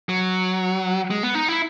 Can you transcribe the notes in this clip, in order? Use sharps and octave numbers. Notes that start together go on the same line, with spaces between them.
F#3
G#3
B3
D#4
E4